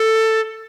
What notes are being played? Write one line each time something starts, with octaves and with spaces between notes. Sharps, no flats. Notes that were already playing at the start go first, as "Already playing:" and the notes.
Already playing: A4